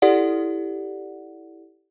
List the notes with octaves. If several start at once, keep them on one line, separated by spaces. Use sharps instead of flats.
E4 G4 A4 D5 F#5